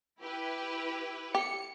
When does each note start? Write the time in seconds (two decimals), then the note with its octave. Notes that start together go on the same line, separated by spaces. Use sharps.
0.22 E4 G4 B4
1.35 G4 C#7